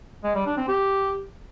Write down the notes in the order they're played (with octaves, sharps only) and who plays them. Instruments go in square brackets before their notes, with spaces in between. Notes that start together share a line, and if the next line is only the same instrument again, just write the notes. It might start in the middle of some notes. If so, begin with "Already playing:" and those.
[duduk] G#3
G3
D4
C4
G4